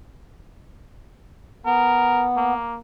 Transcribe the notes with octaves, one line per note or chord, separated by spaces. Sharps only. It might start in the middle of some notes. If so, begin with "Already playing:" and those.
B3 A#4
A#3